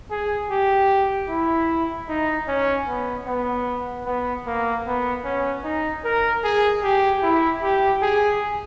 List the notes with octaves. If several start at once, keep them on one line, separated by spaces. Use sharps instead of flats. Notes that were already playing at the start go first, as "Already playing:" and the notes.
G#4
G4
E4
D#4
C#4
B3
B3
B3
A#3
B3
C#4
D#4
A#4
G#4
G4
E4
G4
G#4